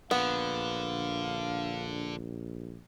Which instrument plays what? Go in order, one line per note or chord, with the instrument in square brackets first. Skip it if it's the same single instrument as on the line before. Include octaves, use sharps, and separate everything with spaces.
[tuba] A#1 [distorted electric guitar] D3 [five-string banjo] B3 [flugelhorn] F5